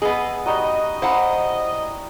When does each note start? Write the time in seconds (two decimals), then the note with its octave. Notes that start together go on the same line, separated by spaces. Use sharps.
0.02 B3 E4 G#4 D#5
0.46 G3 D#4 F#4 D#5
1.02 E4 C5 F5 F#5 A#5 D#6